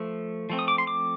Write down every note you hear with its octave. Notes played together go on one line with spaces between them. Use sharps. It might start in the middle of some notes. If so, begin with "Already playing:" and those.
Already playing: F3 A3
F3 A3 C4
D#6
D6
C6
D6